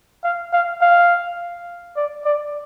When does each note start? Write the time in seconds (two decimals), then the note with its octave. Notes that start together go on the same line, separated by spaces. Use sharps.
0.24 F5
0.53 F5
0.81 F5
1.96 D5
2.25 D5